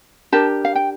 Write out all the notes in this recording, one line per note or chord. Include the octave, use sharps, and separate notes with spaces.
D4 G4 A#4 A5
F5
G5